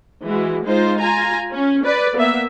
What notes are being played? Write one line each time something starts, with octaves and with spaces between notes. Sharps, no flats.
E3 G#3 F#4
G#3 D#4 F4 C5
F4 G#5 A#5
C#4
B4 D5
A#3 B3 E5